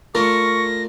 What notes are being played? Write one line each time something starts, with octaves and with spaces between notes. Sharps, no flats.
A3 D4 F4 A#4 C#6 A#6